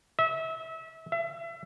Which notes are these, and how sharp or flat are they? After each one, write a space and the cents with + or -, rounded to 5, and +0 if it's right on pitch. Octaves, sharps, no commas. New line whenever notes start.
E5 -30
E5 +30